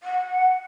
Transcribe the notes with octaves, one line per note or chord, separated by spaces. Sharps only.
F#5